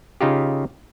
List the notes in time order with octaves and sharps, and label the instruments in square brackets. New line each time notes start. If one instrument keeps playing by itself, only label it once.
[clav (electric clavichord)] C#3 D#4 F4 G4